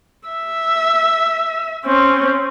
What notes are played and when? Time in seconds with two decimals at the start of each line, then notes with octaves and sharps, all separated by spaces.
0.28 E5
1.86 C4 C#4